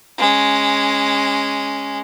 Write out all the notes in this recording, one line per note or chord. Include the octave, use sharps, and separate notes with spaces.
G#3 C#4